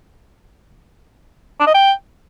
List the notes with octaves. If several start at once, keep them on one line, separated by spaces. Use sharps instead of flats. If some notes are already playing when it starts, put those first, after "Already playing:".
D4
D#5
G5